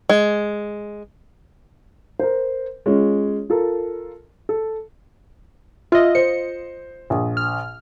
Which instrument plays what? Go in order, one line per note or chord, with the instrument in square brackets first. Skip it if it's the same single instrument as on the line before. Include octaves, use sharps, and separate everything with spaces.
[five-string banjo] G#3
[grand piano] A#4 C5
G#3 C#4 F4
F4 A4 A#4
A4
[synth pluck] F4 D#5 [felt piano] E5 F6
[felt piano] C5 [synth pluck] C#7
[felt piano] A#1
[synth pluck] F6